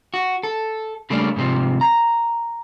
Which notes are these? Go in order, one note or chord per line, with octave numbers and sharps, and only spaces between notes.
F#4
A4
C#3 G3 A3 A#3 C#4 D4
G#2 C3 F3
A#5